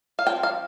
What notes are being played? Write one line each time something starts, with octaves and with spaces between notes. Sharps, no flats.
F5
F3 C4 G5
F5